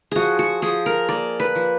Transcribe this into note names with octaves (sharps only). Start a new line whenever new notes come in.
F3 F#4 G#4
F#4
F3 G#4
A#4
A#3 D5
B4
F3